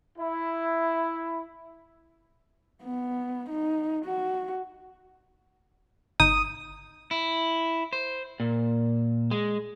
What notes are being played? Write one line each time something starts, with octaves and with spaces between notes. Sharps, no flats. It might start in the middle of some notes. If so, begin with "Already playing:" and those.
E4
B3
D#4
F#4
G1 D#4 D#6 G6
E4
C5
A#2
G#3